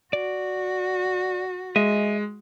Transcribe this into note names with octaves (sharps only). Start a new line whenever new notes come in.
F#4 D5
G#3 D#5 E5